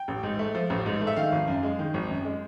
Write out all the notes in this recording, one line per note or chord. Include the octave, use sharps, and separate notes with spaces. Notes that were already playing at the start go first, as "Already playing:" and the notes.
Already playing: G5
A1
G#2
A3
F3
A1
G#2
A3
E5
D#3 F5
G#1
F#2
G#3
D#3
G#1
F#2
G#3